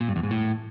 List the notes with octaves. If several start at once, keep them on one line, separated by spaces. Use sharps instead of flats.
A#2
G2
E2
G#2
A2